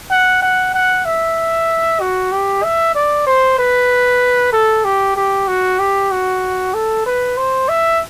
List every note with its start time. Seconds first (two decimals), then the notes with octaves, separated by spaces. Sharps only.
0.10 F#5
0.42 F#5
0.74 F#5
1.05 E5
2.00 F#4
2.32 G4
2.63 E5
2.95 D5
3.27 C5
3.58 B4
4.53 A4
4.85 G4
5.16 G4
5.47 F#4
5.79 G4
6.11 F#4
6.74 A4
7.06 B4
7.37 C5
7.69 E5